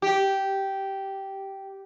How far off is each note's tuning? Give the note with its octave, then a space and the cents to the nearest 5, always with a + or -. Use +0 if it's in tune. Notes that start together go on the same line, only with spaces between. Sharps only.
G4 -10